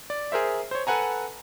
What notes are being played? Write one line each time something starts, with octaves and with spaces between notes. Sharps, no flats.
D5
G#4 A#4 C5 E5
C5 C#5
A4 B4 F#5 G#5 A#5